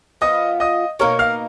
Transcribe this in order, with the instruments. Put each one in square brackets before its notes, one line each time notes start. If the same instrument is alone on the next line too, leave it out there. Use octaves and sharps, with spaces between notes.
[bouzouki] F3 B3 F4 [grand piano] D#5 D#6
[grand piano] D#5 D#6
[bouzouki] B2 A#3 D#4 A#4 [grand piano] C#5 C#6
[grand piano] F5 F6